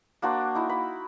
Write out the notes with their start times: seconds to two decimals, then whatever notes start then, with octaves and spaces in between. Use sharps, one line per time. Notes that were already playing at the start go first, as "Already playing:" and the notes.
0.22 A#3 D4 F#4 C5
0.55 D#4 E4
0.69 B5